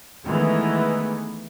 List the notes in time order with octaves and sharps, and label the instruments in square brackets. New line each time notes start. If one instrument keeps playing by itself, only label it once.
[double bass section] D#3 E3 G#3 A3 B3